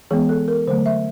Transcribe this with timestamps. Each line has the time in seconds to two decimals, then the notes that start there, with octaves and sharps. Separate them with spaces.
0.11 E3 G#3 B3 G#4
0.29 A4
0.48 A#4
0.67 D3 F#3 A3 C5
0.86 E5